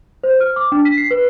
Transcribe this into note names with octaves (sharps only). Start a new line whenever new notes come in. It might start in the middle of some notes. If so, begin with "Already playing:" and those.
C5
F6
D6
D4
B6
C7
B4